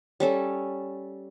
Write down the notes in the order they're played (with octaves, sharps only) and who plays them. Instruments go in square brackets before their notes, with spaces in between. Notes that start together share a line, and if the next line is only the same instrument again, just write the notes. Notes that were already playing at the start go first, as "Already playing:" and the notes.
[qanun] G3 C#4 A4